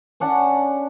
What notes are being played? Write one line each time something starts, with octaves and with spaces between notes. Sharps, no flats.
C#4 D4 F#5 A5